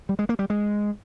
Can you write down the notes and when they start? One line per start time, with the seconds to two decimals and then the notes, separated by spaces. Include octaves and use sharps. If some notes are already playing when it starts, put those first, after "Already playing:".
0.09 G3
0.19 G#3
0.29 A#3
0.39 G3
0.50 G#3